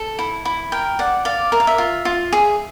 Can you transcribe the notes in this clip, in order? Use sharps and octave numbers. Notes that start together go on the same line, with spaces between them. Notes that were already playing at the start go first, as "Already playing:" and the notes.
Already playing: A4
E4
E4
A#4 G5
D5 F#5
D5 F5
A#4 E5
F5
E5
F4
F4
G#4 E5